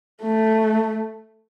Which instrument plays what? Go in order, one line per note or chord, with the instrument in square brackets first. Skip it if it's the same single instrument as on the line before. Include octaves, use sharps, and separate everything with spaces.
[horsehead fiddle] A3